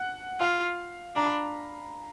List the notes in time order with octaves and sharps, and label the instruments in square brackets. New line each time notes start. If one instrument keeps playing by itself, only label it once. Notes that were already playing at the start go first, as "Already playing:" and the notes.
Already playing: [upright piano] F#5
[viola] F4 [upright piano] F5
[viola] D4 [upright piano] A#5
[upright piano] B5